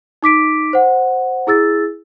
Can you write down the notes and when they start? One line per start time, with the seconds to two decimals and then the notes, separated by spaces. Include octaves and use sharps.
0.23 D#4 D6 B6 D7
0.73 C5 F#5
1.47 E4 G#4 E6 A6